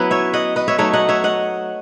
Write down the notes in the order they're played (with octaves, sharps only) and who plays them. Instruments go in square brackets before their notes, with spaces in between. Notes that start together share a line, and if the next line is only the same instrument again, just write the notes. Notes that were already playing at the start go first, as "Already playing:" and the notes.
Already playing: [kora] F#3 B3 C#4 E4 B4
C#5 E5
D#5 F#5
B4 D#5
C#5 E5
F#3 A3 D#4 C#5 E5
D#5 F#5
C#5 E5
D#5 F#5